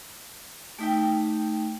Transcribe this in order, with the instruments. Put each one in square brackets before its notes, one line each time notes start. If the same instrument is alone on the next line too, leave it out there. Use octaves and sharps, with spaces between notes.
[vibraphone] A3 D#4 [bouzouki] G4 E5 G5